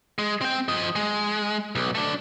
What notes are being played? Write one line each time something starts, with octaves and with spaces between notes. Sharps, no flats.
G#3
C4 G5
F3 D#5
G#3
B1
A3 D4